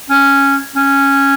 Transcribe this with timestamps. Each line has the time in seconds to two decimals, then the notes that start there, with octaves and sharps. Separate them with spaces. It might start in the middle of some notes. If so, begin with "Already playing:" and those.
0.10 C#4
0.76 C#4